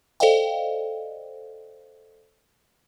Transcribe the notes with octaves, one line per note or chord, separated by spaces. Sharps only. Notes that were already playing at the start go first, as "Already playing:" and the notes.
A4 C5 D5 D#5 F5 G5